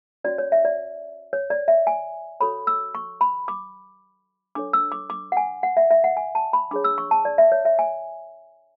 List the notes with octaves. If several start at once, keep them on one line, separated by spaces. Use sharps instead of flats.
C#4 F#4 C#5 D5
C#5
E5
D5
C#5
D5
E5
G#5
F#4 A4 C#5 B5
E6
C#6
B5
D6
D4 A4 C#5 D6
E6
D6
D6
F#5
G#5
F#5
E5
E5
F#5
G#5
A5
B5
D4 G#4 C#5 D6
E6
C#6
A5
D5
E5
C#5
E5
G#5